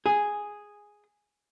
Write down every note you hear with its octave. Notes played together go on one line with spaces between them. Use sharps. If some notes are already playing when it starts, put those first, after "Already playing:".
G#4